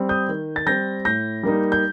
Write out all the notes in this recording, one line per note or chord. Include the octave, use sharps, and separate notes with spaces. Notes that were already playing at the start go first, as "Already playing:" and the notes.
Already playing: G3 C4
D#6 G6
D#3
A6
G3 C4 G6 A#6
A2 G6 A#6
G3 A#3 D#4
G6